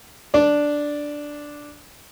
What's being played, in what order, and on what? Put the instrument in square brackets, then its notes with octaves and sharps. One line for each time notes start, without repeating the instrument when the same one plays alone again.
[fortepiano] D4 D5